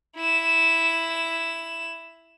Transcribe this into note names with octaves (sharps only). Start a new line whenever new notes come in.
E4 E7